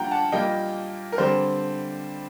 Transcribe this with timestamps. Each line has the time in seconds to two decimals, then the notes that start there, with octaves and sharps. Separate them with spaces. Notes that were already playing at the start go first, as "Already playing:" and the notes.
Already playing: A#2 G3 A#3 D4 F#5 G5 A#5
0.11 F#5 A5
0.32 A#2 G3 A#3 D#5 G5
1.12 A#4
1.18 D3 G3 C4 C5